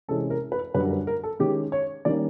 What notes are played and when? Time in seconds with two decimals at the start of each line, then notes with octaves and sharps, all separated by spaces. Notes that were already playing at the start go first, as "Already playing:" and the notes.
0.08 C3 E3 G#3 C#4 A4
0.30 A#4
0.52 B4
0.74 F#2 D3 G3 B4
0.85 A#4
0.91 B4
1.07 A#4
1.24 A4
1.39 D#3 G#3 C#4 G4
1.72 C#5
2.05 D#3 G3 A#3 C#4 D5